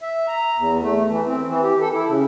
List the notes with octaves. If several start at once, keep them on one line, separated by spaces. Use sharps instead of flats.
E5
A#5
E2
A3
E3
C4
E3
G4
A4
E4
C#3